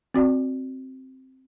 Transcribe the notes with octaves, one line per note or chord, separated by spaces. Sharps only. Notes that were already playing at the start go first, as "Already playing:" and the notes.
C4 F#4 D5